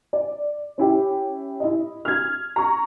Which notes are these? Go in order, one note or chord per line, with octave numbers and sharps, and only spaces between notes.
D5
C#4 E4 G4
E4 D#5
F6 G#6
A#5 C#6